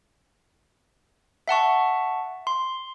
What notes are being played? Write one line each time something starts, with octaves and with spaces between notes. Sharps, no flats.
E5 F#5 A5 C#6
C6